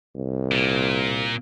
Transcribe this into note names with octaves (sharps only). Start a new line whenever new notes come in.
C2
A#2